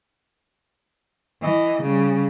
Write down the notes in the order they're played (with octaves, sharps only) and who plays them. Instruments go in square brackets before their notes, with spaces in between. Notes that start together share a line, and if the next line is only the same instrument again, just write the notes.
[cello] E3 D#5
C#3 G3